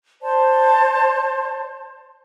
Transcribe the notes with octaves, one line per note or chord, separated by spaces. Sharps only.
C5 D5 A5 C6